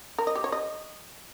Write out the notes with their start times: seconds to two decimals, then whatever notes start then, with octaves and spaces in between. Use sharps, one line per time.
0.19 A#4
0.27 D#5
0.35 G4
0.44 C#5
0.52 D#5